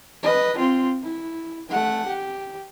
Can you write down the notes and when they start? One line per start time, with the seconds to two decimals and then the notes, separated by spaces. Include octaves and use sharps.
0.23 B4 D#5
0.58 C4 F4
1.03 E4
1.69 A3 F#5
2.07 G4